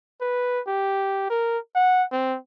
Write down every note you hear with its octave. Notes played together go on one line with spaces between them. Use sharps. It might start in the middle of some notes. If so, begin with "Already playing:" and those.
B4
G4
A#4
F#5
C4